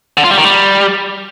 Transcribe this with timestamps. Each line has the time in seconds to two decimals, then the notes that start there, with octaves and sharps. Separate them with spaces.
0.17 D3
0.24 F4
0.31 G3
0.37 D#3
0.44 G3